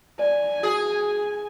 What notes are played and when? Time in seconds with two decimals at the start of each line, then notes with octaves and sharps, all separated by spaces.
0.19 D5 G#5
0.63 F#4 G#4